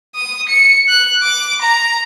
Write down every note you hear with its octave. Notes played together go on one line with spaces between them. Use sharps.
D#6
C#7
F#6
D6
A#5